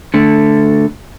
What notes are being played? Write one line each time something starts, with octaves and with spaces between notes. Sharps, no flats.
D3 A3